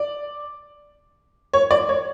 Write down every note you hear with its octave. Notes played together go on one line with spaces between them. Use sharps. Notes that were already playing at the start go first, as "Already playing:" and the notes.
Already playing: D5
C#5
D5
C#5